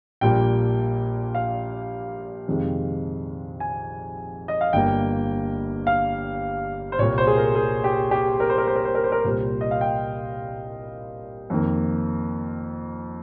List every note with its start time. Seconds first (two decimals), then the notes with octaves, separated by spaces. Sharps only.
0.21 A#1 A#2 G3 A#3 G5
1.35 F5
2.48 F2 C3 D#3 G#3
3.60 G#5
4.48 D#5
4.61 F5
4.73 G1 G2 G3 A#3 G5
5.87 F5
6.92 C5
6.99 C2 A#2 G3 A#3 C#5
7.18 C5
7.27 G#4
7.37 A#4
7.55 G#4
7.84 G4
8.11 G4
8.40 A#4
8.50 C5
8.58 A#4
8.67 C5
8.76 A#4
8.85 C5
8.95 A#4
9.04 C5
9.12 A#4
9.25 C2 A#2 G3 C5
9.61 D#5
9.71 F5
9.81 G5
11.50 F2 D#3 A#3